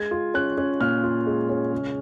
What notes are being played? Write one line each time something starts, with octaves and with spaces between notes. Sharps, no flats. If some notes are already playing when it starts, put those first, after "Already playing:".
Already playing: G#3 G#6
F4
C#4 F#6
C#4
A#2 F6
F4
G#3
C#4
C#3